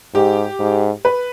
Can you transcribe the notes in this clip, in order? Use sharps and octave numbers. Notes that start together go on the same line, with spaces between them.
G#2 G4
G#2
B4